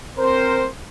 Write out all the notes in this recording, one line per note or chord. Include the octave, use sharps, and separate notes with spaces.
C4 A#4 C5